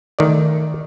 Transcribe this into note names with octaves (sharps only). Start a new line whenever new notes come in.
D#3 A3 D5